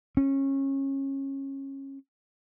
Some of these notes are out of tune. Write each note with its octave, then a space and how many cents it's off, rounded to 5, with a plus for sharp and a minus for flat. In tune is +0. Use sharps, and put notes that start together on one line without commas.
C#4 -25